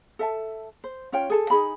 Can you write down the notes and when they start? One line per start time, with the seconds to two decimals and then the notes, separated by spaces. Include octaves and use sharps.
0.19 A4 E5 A5
0.84 C5
1.12 C#4 F4 C#5 G5
1.30 G#4 A4 A5
1.50 D#4 G#4 B5